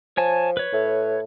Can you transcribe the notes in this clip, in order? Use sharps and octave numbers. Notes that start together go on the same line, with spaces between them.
F3 C#5 G#5 A5
B4 C#5
A2